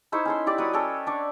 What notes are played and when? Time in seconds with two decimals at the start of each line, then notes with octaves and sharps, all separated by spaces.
0.12 D#4 E4 C5 C#5
0.25 C#4 A4 C6
0.46 E4 G4 D5
0.58 F#3 B4 C#5 D#6
0.73 C#4 A4 C#5 G5
1.06 D4 D5 C#6